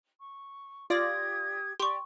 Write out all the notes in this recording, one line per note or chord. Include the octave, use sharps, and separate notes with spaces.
C#6
F4 G4 D5 D#6 G#6 A#6
G4 D5 C6 C#6